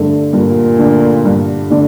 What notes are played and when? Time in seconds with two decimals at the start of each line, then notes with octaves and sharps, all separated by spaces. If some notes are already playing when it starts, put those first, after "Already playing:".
Already playing: G2 D3 A3 D4
0.33 G2 A#2
0.79 D3 A3 D4
1.25 G2
1.70 D3 A3 D4